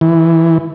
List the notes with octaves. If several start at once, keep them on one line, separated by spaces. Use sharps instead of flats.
E3